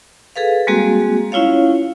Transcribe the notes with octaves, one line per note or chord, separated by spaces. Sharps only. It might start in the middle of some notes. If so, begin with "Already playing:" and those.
G#4 A4 B4 F5
G3 G#3 A#3 C4 F#4 G#4
C#4 E4 F4 C#5 F5